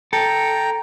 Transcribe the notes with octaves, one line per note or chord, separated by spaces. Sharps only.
A4 G5 A#5